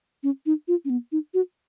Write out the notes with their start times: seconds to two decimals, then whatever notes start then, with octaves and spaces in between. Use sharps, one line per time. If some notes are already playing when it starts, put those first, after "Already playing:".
0.23 C#4
0.46 D#4
0.68 F4
0.85 C#4
0.90 B3
1.12 D#4
1.34 F#4